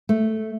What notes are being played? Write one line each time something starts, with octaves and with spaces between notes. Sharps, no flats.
A3